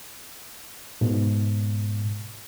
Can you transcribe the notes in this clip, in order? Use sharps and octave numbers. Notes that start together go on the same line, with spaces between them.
G#2 B2